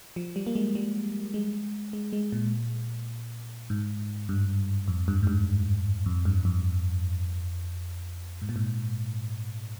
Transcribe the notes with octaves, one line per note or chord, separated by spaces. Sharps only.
F3
G3
A#3
G#3
G3
G#3
G#3
G#3
A#2
G#2
G2
F2
G2
G#2
G2
F2
G2
F2
G#2
A#2
G#2